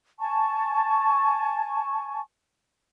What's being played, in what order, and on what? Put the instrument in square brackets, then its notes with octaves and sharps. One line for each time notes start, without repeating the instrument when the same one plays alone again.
[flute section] G#5 A5 C#6